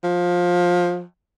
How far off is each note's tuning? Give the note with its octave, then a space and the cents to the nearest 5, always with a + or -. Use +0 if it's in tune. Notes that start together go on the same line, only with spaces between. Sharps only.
F3 +20